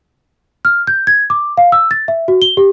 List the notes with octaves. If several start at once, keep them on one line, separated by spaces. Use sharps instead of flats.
F6
G6
G#6
D6
F5
E6
A6
E5
F#4
G7
G4